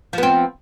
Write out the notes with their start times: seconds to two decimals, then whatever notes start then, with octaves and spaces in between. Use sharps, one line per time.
0.13 F3
0.18 B3
0.23 C4